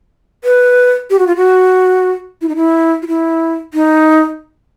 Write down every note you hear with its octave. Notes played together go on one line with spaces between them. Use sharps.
B4
G4
F#4
F4
F#4
E4
D#4
E4
F4
E4
D#4